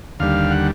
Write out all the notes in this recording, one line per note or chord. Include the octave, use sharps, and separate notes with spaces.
D#2 D3 G3 F5
F#5